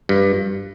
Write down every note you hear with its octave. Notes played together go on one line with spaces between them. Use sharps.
G2